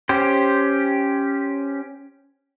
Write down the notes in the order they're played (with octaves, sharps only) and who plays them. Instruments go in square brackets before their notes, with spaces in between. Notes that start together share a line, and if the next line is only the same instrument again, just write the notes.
[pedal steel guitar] C#4 G4 C5